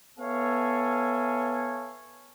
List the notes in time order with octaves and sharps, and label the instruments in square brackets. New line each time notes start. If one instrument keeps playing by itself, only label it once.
[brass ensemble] B3 A4 C#5 E5 F5 G#5